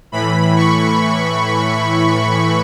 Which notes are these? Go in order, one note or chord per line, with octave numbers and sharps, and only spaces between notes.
A2 E3 B5
C#6